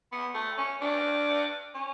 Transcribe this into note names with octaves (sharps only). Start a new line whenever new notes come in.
B3
A3
C#4
D4
C#4